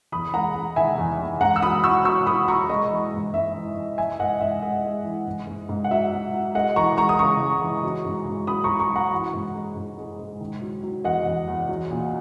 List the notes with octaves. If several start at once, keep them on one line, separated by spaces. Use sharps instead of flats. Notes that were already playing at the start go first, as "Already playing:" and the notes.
E2 B5 D#6
G#3 F#5 A#5
G#3
D#3 E5 G#5
E2
E2
G#2 F#5 A#5
E6
F#3 B5 D#6
F#3 C#6 E6
F#3 C#6 E6
F#3 B5 D#6
F#3 A#5 C#6
G#3 D#5
E3
G#2
G#2 E5
E3
E3
E3 E5 G#5
G#2 D#5 F#5
G#2 E5
G#3 D#5
G#3
E3
G#2
G#2
G#2
F#5
F#3 E5
F#3
F#3
G#3 D#5 F#5
E3 A#5 C#6
G#3 A#5 C#6
D#6
C#3 A#5 C#6
G#3
E3
F#3
G#2
G#2
F#3 B5 D#6
A#5 C#6
F#3
A#5 C#6
F#3
F#5 A#5
E3
G#2
G#3
G#2
G#3
G#2
D#3
F#3
F#3
E2 D#5 F#5
E2
E2
F#3
A#2